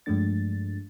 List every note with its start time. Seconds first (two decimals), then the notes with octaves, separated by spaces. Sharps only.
0.06 G2 F3 G#3 A3 D4 A6